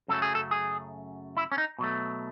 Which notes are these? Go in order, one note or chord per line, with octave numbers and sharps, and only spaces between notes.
F#2 C#3 F#3 A3 A4
G#4
A4
G#4
E4
C#4
D#4
B2 F#3 A3